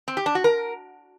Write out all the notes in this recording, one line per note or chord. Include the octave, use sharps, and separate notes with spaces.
C4
G4
D4
F#4
A#4